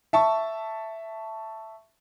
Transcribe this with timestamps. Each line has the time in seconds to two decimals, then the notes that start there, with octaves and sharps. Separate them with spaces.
0.13 E5 A5 C#6